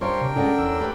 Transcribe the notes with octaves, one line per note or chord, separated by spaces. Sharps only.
G3 D4 A#4 C5 C#5 F5 G5 C6
C3
G#3 C#4 A4 D5 F#5
E2 E6
A3 G4 B4